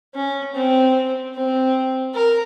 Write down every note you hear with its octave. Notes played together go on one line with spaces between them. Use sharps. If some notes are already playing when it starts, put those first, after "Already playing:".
C#4
C4
C4
A#4